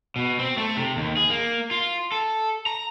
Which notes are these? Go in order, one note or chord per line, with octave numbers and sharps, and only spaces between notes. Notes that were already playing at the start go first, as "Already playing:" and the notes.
B2
C4
A3
C3
D#2
G#4
A#3
F4
A4
A#5